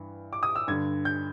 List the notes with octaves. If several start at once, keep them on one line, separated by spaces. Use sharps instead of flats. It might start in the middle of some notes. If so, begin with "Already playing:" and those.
Already playing: G2 E3
D6
D#6
E6
G2 D3 G#6
G6